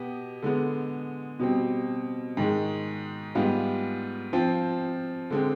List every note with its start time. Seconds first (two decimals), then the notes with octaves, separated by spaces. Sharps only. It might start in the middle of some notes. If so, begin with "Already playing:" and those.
Already playing: B2 B3 G4
0.42 D3 G#3 B3
1.40 B2 G3 C4
2.37 G#2 D#3 G#3
3.35 G#2 G3 B3 F4
4.33 F3 C4 F4
5.30 D3 G#3 C4